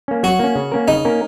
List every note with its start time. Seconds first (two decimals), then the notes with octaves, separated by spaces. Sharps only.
0.08 A#3 C#4
0.23 F#3 F#4
0.39 A#3 C#4
0.56 C#3
0.72 A#3 C#4 A#4
0.88 C#3 D#4
1.05 A#3 C#4 A#4